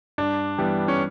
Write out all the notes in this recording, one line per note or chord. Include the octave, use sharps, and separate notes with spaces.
G2 D4
E3 G3 B3
C#4